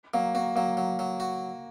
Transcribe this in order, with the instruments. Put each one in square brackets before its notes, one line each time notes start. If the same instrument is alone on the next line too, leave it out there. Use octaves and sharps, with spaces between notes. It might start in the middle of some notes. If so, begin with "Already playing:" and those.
[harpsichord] F#3 [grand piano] A#3
[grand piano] A#3 [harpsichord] F#4
[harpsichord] F#3 [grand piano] A#3
[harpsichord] F#3
F#3
F#4